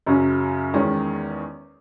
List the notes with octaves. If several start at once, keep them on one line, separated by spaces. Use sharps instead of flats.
F#2 C#3 F#3 C#4
E2 D#3 G#3 C#4